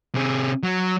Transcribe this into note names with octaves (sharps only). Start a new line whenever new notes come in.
C3 G#4
F#3